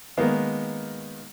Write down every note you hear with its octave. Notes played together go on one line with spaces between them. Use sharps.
D#3 G#3 A#3 B3 D#4